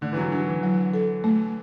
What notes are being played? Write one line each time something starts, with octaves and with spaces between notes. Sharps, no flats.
D3 A3
E3
F#3
F#3 D4
E3
F#3
A4
A3